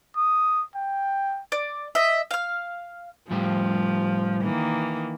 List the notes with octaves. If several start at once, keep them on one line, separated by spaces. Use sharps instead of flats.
D#6
G5
D5
D#5 E5
F5 F6
A2 F3 G3 G4
D#3 E3 A#3